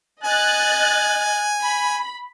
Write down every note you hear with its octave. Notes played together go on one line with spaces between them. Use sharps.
D#5 G#5 F#6 A6
B5